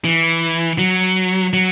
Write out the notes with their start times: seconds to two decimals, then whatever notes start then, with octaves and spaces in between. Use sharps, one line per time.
0.04 E3
0.78 F#3
1.53 F#3